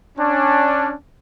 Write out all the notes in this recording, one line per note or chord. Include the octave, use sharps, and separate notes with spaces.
C#4 D4